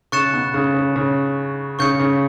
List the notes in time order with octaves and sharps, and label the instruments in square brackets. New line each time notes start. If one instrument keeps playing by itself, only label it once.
[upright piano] C#3 [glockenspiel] C#6 F#6 A6 C#7 E7
[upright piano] B2
C#3
C#3
C#3
[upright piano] C#3 [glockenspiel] C#6 G6 C#7
[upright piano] C#3